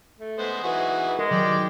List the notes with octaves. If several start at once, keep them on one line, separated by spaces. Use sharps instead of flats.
A3
G#3 B3 C5
E3 D#4 F#4 G#4
G#3 A#4
D#3 F#3 D5 G5